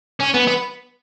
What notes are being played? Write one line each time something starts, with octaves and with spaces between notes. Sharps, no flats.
C#4
B3
B3